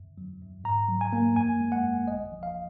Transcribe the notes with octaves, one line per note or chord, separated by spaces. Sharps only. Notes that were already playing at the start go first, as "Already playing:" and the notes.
Already playing: F#2
F#3
F#2
G#2 A#5
F#3
G#5
A#3
F#2 G#5
G#3
F#5
F#2
G#1 D#5
F3
F5